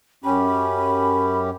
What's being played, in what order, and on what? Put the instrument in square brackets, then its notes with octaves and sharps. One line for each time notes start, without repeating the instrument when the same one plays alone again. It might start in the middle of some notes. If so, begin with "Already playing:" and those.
[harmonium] F#2 C#4 G4 [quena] B5